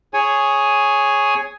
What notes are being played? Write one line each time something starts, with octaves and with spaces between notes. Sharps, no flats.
G#4 C#5 G#5